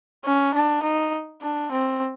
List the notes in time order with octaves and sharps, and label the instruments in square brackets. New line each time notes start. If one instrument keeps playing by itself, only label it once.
[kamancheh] C#4
D4
D#4
D4
C4